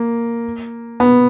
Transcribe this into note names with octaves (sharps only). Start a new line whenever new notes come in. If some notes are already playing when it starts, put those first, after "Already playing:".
Already playing: A#3
B3